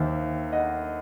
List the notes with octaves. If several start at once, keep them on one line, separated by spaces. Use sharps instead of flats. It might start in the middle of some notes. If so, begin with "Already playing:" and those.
Already playing: D#2 D#3 C5 E5
D#5 F#5